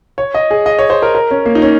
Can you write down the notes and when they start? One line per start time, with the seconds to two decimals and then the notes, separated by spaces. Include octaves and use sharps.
0.18 C#5
0.35 D#5
0.51 G#4
0.66 D#5
0.79 C#5
0.90 C5
1.02 A#4
1.15 A#4
1.31 C#4
1.46 A#3
1.55 D#4
1.62 C#4